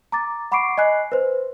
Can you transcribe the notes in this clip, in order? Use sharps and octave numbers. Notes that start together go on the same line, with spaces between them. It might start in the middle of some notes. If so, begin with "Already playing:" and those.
A#5 D6 A6
F#5 B5 C#6 D6 C7 D7
D#5 G#5 F#6 C7
B4 C5